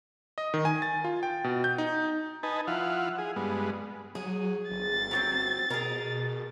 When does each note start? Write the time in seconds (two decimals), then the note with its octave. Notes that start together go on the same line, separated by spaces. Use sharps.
0.38 D#5
0.54 D#3
0.65 G#5
0.82 A6
1.04 F4
1.23 G5
1.44 B2
1.64 G6
1.78 D#4
2.43 D#4 B4 G#5 A5
2.67 F3 E4 F5 F#5
3.18 G#4
3.36 G2 G#3 B3
4.15 F#3 G#4
4.71 G1 A6
5.11 G1 F#3 B3 C4
5.70 B2 G#4 A#4